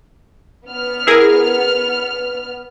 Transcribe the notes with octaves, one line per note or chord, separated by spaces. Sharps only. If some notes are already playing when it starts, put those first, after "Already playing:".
B3 F6
E4 G#4 A#4